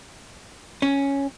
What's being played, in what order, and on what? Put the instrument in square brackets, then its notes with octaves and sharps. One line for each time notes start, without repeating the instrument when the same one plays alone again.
[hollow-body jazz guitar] C#4